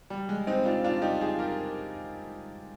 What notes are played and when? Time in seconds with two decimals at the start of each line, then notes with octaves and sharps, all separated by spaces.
0.10 G3
0.29 G#3
0.47 C4 D#4
0.65 D4 F4
0.84 D4 F4
1.02 D#4 G4
1.21 F4 G#4
1.39 G4 A#4